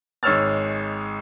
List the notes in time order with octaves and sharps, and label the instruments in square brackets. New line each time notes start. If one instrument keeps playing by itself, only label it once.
[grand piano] G#1 G#3 C#5 E6 F6 A6